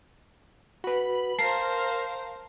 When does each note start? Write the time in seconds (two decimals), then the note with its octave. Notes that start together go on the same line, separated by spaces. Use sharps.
0.84 F#4 B4 B5
1.39 A#4 C5 F5 A5 A#5 C7